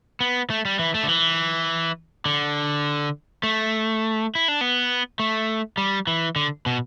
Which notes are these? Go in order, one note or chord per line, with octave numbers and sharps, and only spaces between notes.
B3
A3
G3
E3
A3
D3
E3
D3
A3
E4
D4
B3
A3
G3
E3
D3
B2